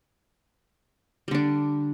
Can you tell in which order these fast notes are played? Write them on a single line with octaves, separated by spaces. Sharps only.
G3 D3 D4